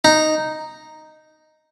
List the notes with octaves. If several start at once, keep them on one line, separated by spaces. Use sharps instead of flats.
D#4